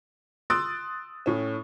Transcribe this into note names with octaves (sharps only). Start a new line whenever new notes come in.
C6 D#6 E6 F#6 A6 D7
A2 C#4